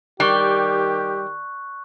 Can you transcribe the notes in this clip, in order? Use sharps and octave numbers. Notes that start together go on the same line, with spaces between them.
D#3 G3 G4 C#6 F#6